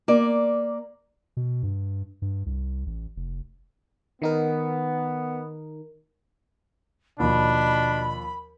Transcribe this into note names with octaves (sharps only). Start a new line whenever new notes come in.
A#3 D5
B2
G2
G2
C2
A1
F1
D#3 B3 D#4 A#4
D#2 B2 F3 D4 B5